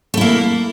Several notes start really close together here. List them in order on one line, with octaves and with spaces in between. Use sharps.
A3 E4 A#3